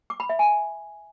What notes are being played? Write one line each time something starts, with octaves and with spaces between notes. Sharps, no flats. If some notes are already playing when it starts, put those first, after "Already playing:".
D6
B5
E5
G#5